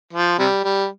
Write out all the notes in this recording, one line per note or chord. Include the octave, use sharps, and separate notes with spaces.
F3
C3 G3
G3